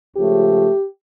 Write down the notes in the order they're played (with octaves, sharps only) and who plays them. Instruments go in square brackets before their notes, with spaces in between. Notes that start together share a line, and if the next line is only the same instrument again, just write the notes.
[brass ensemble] C#2 C#3 F3 A3 G4